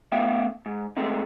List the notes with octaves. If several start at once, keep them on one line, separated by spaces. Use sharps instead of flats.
A3 B3 E5 F5 G5
G#2
G#3 A3 C4 D#4